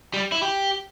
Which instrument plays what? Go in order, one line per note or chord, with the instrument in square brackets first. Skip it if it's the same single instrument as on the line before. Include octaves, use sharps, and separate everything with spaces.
[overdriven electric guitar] G3
E4
G4